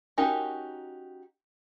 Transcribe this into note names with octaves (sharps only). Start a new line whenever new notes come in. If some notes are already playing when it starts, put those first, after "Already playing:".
C#4 D#4 F#4 G4 A#4